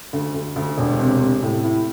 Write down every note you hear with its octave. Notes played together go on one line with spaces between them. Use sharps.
D2
D2
D2
E1
C3
C3
A2
E4